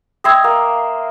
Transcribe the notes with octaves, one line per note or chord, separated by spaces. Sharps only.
D#5 E5 G5 C6 E6 G#6
A#3